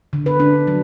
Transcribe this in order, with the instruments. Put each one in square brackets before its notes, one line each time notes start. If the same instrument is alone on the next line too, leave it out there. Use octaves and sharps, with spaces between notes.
[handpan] D3
B4
D4
F#3